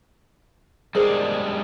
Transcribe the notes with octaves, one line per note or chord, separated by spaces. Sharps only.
G3 G#3 D4 G#4 A#4 C5